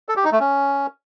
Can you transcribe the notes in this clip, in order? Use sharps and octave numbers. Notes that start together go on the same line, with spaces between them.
A4
G4
D#4
A3
C#4